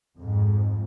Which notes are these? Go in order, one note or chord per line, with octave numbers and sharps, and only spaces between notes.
F2 G#2